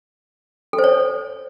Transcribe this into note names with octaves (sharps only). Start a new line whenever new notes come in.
A4
C5
C#5